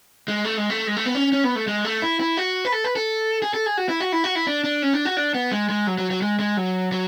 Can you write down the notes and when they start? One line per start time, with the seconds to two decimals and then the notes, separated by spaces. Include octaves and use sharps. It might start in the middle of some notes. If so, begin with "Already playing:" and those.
0.28 G#3
0.45 A3
0.57 G#3
0.70 A3
0.87 G#3
0.97 A3
1.06 B3
1.15 C#4
1.32 C#4
1.44 B3
1.56 A3
1.67 G#3
1.85 A3
2.02 E4
2.20 E4
2.37 F#4
2.65 B4
2.72 A4
2.84 B4
2.96 A4
3.42 G#4
3.54 A4
3.66 G#4
3.77 F#4
3.89 E4
4.00 F#4
4.12 E4
4.24 F#4
4.35 E4
4.47 D4
4.64 D4
4.82 C#4
4.93 D4
5.05 F#4
5.17 D4
5.34 B3
5.52 G#3
5.69 G#3
5.87 F#3
5.98 F#3
6.10 F#3
6.22 G#3
6.39 G#3
6.57 F#3
6.92 F#3